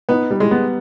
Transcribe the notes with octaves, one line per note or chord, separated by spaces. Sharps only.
B3 D#4
G3
G#3
B3